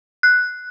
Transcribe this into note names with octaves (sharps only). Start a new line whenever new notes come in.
F#6